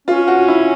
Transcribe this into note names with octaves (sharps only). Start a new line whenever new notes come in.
C#4 F4
F#4
E4